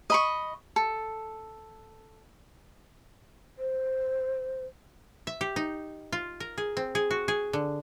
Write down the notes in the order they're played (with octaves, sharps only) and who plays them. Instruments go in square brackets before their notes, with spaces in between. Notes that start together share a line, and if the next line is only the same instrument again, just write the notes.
[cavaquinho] D#5 B5 C#6
A4
[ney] C5
[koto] E5
G4
D#4
F4
A#4
G#4
C4
G#4
F#4
G#4
D3